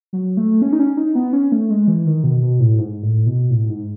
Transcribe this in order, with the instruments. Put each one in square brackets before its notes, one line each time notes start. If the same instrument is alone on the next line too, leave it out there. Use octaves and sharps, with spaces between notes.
[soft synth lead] F#3
A3
C#4
D#4
C#4
D#4
B3
C#4
A3
G#3
E3
D#3
B2
B2
A2
G#2
A2
B2
A2
G#2